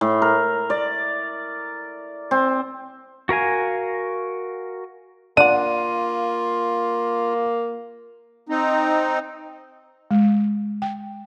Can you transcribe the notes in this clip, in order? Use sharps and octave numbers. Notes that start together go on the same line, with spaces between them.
A2
A#4
D5
C4
F#4 A#4 F5 G#5
A#3 D4 F4 F#5 D#7
C4 D#4
G#3
G5